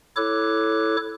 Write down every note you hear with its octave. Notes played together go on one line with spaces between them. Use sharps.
E4 A4 C#5 D6 F#6